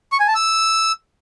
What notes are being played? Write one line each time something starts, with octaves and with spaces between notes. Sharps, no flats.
C#6
G#5
A5
E6